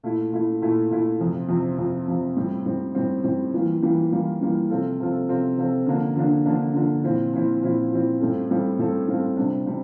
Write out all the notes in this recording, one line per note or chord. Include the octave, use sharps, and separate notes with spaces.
A#2 A3 E4
A#2 A3 E4
A#2 A3 E4
A#2 A3 E4
F2 C3 F3
F2 C3 F3
F2 C3 F3
F2 C3 F3
A2 G3 C4
A2 G3 C4
A2 G3 C4
A2 G3 C4
E3 G3 A#3 F4
E3 G3 A#3 F4
E3 G3 A#3 F4
E3 G3 A#3 F4
C3 F3 C4 F4 A4
C3 F3 C4 F4 A4
C3 F3 C4 F4 A4
C3 F3 C4 F4 A4
D3 F3 A#3 D4
D3 F3 A#3 D4
D3 F3 A#3 D4
D3 F3 A#3 D4
A#2 F3 C4 E4
A#2 F3 C4 E4
A#2 F3 C4 E4
A#2 F3 C4 E4
A2 G3 C4 F4 A4
A2 G3 C4 F4 A4
A2 G3 C4 F4 A4
A2 G3 C4 F4 A4
C3 G3 D4
C3 G3 D4